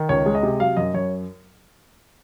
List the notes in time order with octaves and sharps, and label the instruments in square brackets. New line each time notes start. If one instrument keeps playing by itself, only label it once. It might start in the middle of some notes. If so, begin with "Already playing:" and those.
Already playing: [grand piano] D#3
C#2 C#5
G#3
D#5
C3
F#3 F5
F#2 D#5
F#2 C#5